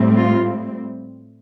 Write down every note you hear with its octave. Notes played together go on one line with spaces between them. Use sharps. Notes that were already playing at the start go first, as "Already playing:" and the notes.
Already playing: A2 G3 C4
F4